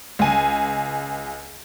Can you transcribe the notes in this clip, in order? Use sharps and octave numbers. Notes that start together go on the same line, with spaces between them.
C#2 G#5